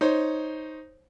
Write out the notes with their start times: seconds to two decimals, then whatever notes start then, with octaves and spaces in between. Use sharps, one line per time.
0.01 D#4 C5 C#5